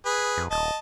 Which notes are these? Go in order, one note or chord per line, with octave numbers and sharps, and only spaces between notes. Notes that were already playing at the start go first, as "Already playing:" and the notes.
G#4 B4
F2
D#1 D#5 A5